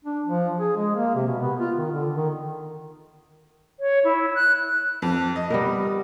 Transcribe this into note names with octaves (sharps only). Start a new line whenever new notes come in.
D4
F3
G#4
G#3
A#3
C3
B2
B3
F4
D#3
D3
D#3
C#5
E4
F#6
F2
D#5
G3 B3 A#4